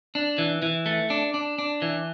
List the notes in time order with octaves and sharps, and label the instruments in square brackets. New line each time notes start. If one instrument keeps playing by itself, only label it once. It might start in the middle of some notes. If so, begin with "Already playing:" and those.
[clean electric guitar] D4
E3
E3
A3
D4
D4
D4
E3